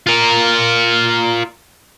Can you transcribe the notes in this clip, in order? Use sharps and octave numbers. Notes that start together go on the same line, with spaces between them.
F4 A#4